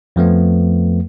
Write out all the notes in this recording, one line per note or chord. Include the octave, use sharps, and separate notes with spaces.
F2 F3 A3 B3